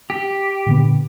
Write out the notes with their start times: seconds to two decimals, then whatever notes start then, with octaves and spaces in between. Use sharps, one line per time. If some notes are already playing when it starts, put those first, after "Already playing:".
0.10 G4
0.66 A#2 D3 B3